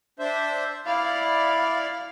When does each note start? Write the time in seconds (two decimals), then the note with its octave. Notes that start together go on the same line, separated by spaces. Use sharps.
0.19 D4 C5 E5
0.86 E4 D5 F5